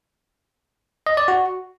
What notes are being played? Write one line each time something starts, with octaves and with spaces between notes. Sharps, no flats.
D#5
D5
F#4